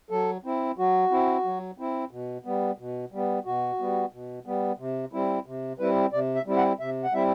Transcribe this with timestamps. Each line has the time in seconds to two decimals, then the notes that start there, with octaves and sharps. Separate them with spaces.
0.10 F#3 A4
0.44 C4 E4
0.78 F#3 F#4
1.11 C4 E4
1.44 F#3
1.78 C4 E4
2.11 B2
2.44 G3 B3
2.78 B2
3.12 G3 B3
3.45 B2 F#4
3.79 G3 B3
4.13 B2
4.46 G3 B3
4.79 C3
5.13 G3 C4 E4
5.46 C3
5.79 G3 C4 E4 B4
6.13 C3 D5
6.35 E5
6.46 G3 C4 E4
6.57 F#5
6.80 C3 E5
7.04 F#5
7.12 G3 C4 E4 E5